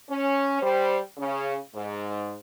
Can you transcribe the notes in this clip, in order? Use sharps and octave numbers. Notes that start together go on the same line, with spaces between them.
C#4
G3 C5
C#3 C#4
G#2